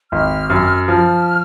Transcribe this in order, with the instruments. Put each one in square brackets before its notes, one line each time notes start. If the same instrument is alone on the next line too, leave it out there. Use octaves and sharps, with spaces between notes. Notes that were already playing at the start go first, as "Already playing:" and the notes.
[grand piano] G#1 [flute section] F6
[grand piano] F#2
[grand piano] F3 [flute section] F6